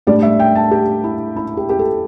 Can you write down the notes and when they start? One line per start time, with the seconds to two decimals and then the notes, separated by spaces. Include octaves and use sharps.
0.07 A2 G3 D4 D5
0.23 E5
0.39 G5
0.55 A5
0.71 G4
1.04 E4
1.36 E4
1.57 G4
1.69 G4
1.79 A4